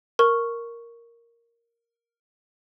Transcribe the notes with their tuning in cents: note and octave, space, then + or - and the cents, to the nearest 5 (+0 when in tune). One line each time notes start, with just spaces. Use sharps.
A#4 +0 C#6 +0